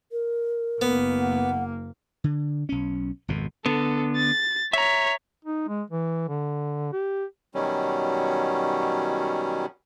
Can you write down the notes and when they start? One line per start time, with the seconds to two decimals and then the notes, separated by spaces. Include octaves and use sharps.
0.12 A#4
0.82 F#1 A#3 B3
1.20 F#5
2.24 D3
2.69 B1 C#4
3.28 G#1 F2 B2
3.66 D3 B3 A4
4.17 A6
4.73 C#5 E5 A#5 B6
5.45 D#4
5.68 G#3
5.90 E3
6.29 D3
6.93 G4
7.55 B2 D#3 F#3 G3 C#4